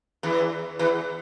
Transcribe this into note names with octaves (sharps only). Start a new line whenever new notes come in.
E2 E3
E2 E3